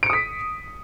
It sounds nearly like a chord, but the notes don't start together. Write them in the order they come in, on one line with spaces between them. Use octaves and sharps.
D7 C#7 D#6 B6